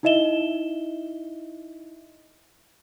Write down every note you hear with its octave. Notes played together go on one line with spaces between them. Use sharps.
D#4 E4 D#5 E5 E7 G7